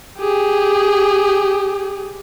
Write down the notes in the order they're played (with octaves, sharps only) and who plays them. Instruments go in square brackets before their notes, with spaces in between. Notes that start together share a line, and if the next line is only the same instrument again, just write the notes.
[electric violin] G4 G#4